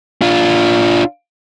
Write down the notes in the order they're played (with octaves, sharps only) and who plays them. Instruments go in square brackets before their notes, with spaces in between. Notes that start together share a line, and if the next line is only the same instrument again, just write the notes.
[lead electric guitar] D4 F4